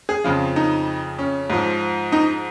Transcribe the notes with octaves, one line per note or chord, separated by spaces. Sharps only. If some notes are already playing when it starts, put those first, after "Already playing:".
G#4
F2 C#3 F3 F4
D#4
C#4
G#2 F3
D#4